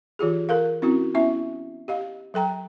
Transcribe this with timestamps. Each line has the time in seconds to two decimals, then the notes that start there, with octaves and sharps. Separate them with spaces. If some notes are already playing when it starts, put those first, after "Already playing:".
0.19 E3 F4 G4 G#4
0.49 A4 A#4 F5
0.82 C4 C#4 E4 F#4
1.14 B3 C#4 E4 E5
1.88 G4 D#5 F5
2.34 F#3 A4 G5 A#5